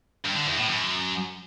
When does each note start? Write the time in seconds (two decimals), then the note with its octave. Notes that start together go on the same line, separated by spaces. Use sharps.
0.25 G2
0.35 D3
0.46 E2
0.57 A2
0.68 F#2